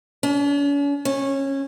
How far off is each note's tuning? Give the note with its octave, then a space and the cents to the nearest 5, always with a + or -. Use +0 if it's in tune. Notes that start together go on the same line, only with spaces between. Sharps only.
C#4 +45
C#4 -20